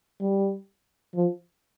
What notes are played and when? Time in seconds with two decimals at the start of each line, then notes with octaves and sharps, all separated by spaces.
0.21 G3
1.15 F3